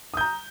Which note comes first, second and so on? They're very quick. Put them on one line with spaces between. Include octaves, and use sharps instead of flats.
D#6 G6 A#5